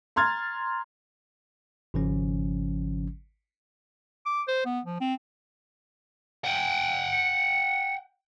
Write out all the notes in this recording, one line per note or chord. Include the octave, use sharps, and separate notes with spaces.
A#5 C6 F6 G#6 A6
G#1 C#3 F3 C#4
D6
C5
B3
F3
C4
F#5 G5
C#7